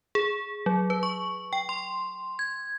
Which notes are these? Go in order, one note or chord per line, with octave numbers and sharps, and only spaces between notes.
G#4
F#3
B4
C#6
G5
C6
G#6